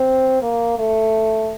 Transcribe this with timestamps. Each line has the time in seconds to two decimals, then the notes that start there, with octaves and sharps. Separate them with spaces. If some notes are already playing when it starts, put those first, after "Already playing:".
Already playing: C4
0.42 A#3
0.79 A3